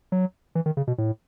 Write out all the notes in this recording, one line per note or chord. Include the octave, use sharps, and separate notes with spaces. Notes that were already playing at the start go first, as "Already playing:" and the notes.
F#3
E3
D#3
C#3
B2
A2